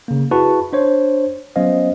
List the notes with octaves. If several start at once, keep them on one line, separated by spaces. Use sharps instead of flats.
C#3 A#3
E4 F#4 G#4 B4 A5 C#6
D4 C5 C#5
F#3 B3 C#4 C5 D#5 F5